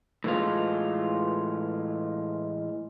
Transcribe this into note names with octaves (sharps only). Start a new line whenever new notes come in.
A2 E3 G#3 F4